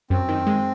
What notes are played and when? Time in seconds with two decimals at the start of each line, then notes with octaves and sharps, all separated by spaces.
0.10 F#2 C4
0.29 D#3
0.47 G#3